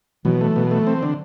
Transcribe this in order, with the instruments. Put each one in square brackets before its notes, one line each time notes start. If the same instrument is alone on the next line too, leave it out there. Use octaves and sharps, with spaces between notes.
[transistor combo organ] B2 [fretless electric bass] E3 F#3
[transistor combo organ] A3
B2
A3
C4
D3